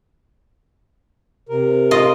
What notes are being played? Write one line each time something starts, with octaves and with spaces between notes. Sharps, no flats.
C3 A#4
F4 D#5